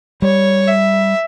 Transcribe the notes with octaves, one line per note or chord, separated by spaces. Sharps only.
G3 C#5
E5